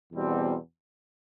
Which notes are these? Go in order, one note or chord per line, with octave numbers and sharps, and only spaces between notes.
E2 B2 G3 C4